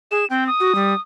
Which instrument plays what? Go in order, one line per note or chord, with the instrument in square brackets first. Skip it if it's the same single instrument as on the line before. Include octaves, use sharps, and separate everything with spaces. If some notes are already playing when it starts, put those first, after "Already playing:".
[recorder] G#4 [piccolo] E7
[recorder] C4 [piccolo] G5
[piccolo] D#6
[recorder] F#4
G3